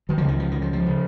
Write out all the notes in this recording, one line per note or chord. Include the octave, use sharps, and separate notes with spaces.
D#3 F#3
C#2 C#3 F3
D#3
F3
D#3
F3
F3
C#3